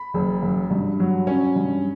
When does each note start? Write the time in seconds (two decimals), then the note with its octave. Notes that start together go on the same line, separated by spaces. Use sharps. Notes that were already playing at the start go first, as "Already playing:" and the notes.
Already playing: B5
0.14 F#1
0.43 F#2
0.70 G2
1.00 F#3
1.27 C#4
1.56 G2